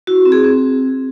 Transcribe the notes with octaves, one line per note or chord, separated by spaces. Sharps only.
E4 F#4
C4
G#4
C4